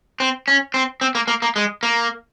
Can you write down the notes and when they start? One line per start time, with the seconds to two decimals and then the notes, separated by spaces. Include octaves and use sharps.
0.20 C4
0.48 C#4
0.74 C4
1.01 C4
1.15 A#3
1.28 A#3
1.42 A#3
1.56 G#3
1.83 A#3